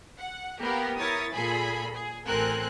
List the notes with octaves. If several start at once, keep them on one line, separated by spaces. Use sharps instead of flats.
F#5
A#3 B3 G4 A#4
E4 A#4 C#5 D#6 A6
A#2 G#4 A4 B5
G#4
A1 C4 A4 A#4 G#5 F#6